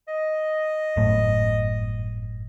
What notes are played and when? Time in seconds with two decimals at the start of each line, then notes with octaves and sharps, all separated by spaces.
0.08 D#5
0.97 G1 F#2 A2